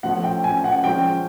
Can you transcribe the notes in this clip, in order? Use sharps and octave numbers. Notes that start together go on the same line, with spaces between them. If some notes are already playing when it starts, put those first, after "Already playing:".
A2 F3 A3 F#5
G5
G#5
F#5
F3 G#3 C#4 G5